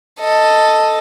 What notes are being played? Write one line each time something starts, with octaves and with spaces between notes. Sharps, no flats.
A4 D#5